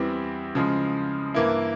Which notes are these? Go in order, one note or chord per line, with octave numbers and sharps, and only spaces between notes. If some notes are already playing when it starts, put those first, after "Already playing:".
Already playing: E2 E3 G3 C4
C#3 F3 G#3
G2 E3 A#3 E4